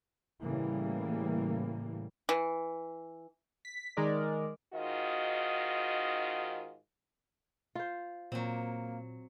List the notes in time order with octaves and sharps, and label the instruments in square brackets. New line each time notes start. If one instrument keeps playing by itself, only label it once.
[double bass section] A2 C#3 E3 G3 A#3
[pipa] E3
[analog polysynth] B6
D#3 G#3 A#4 D5
[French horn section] G#2 D#3 F4 F#4 D#5
[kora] F4 C5
[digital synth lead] A#2 [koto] F#3 C4 [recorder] A#3